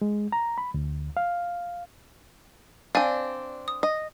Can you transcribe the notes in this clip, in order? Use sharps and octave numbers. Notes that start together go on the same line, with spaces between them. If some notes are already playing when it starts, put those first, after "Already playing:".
G#3
A#5
B5
D2
F5
C4 D4 D5 F5 G#5
D#6
D#5